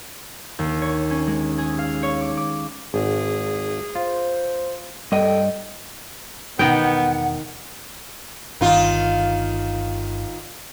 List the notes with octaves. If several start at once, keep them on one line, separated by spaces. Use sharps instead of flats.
D#2
C#5
C#4
G#3
G#4
F5
C#5
D6
D6
G#1 G#4
F4 C5
G2 A4 D#5 G5
E1 D#3 B3 F#5 G5
G1 D#3 F4